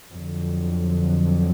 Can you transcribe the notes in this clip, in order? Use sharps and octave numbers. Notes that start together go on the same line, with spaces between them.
F2 D3 F#3